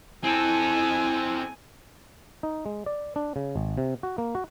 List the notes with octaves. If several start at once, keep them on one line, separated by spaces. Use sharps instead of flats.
C4 E4 A4 G#5
D#4
G#3
D5
D4
C#3
G#1
C3
F#4
A#3
F#4